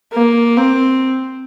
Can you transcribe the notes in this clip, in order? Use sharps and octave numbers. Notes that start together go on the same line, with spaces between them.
A#3
C4